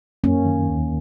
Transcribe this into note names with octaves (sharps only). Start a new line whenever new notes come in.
F#2 A#3 C#4
D#3
D#2